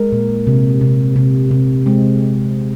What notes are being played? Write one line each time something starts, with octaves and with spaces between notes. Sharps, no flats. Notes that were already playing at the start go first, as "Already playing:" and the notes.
Already playing: G#3 A#4
A#2
C3
C3
C3
C3
G#3 C4